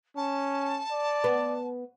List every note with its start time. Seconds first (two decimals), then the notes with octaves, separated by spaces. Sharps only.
0.16 C#4 A5
0.91 D5
1.24 B3